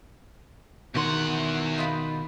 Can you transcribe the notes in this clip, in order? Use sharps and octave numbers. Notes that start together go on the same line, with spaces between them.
E2 B2 D#3 C#5 F#5 C6
D#4 F4 B5